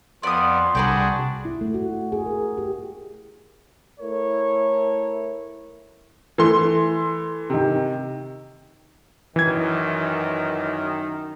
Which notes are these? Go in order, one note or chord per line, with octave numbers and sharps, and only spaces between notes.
F2 B3 D5 C6 D#6
C2 D4 F#4 G#4 B4 D5 G5
E4
A3
F#4
G#4
A#4
G4
A3 E4 A#4 C#5
E3 A3 C6
C3 D#3
F#2 D#3 E3 G#6